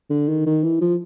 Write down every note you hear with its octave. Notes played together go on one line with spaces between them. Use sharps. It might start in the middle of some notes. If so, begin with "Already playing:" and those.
D3
D#3
D#3
E3
F3